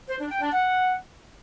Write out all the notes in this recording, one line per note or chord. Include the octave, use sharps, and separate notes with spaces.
C5
D4
G5
D4
F#5